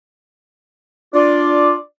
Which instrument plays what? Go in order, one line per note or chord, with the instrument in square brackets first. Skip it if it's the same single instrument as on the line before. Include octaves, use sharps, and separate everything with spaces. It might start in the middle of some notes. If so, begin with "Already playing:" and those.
[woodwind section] D4 F4 D5